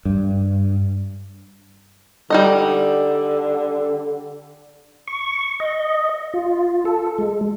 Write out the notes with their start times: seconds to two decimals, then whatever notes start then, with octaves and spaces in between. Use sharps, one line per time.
0.05 G2
2.30 D3 G3 D#4 D#5
5.07 C#6
5.60 D#5
6.34 F4
6.85 A4
7.18 G#3